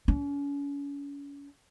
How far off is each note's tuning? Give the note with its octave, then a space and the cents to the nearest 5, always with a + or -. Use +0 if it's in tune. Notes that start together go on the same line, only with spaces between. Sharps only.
C#4 +35